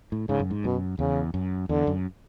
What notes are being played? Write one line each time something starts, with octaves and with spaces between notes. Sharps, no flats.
A2
G#2 C#3
F#2
G#2
F#2 B2
E2 C#3
F#2
E2 D3
F#2